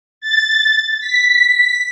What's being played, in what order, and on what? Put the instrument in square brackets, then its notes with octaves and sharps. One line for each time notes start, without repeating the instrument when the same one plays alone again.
[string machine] A6
B6